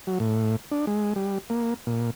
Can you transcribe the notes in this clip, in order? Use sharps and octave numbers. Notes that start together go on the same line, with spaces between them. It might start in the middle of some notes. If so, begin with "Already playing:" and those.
F#3
A2
D4
G#3
G3
A#3
A#2